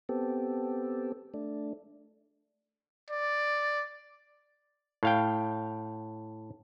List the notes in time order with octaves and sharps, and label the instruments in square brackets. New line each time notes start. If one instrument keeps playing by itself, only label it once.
[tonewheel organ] B3 C4 G4 A4
A3 D4
[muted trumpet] D5
[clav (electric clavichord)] A2 F5 G5